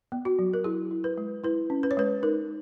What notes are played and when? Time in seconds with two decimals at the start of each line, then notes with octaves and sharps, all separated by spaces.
0.12 B3
0.25 F#4
0.39 F#3
0.54 A#4
0.64 E4 G#4
0.91 E4
1.04 B4
1.18 G#3
1.44 E4 B4
1.70 C#4
1.83 B4
1.91 C#5
1.97 G#3 B4
2.23 D#4 A#4